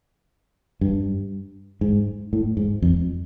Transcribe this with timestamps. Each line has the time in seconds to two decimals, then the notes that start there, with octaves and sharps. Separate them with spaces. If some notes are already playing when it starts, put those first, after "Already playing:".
0.81 G2
1.81 G#2
2.33 A2
2.57 G#2
2.82 F2